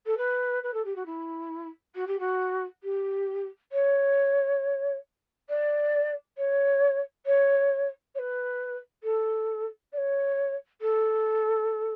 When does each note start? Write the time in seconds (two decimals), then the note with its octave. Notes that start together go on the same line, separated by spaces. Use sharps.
0.06 A4
0.17 B4
0.63 B4
0.73 A4
0.84 G4
0.95 F#4
1.05 E4
1.94 F#4
2.07 G4
2.19 F#4
2.83 G4
3.72 C#5
5.49 D5
6.37 C#5
7.25 C#5
8.14 C#5
8.18 B4
9.03 A4
9.92 D5
9.97 C#5
10.81 A4